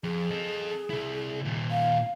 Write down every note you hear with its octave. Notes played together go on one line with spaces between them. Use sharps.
F2 G#4
A4 D#5
C3 E4
D#2 A#2
F5